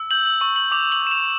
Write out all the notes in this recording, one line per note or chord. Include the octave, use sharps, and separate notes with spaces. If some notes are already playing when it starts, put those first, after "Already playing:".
Already playing: E6
G6 F#7
F#7
C#6 F#7
F#7
D6 F7
F#7
G6 E7
F7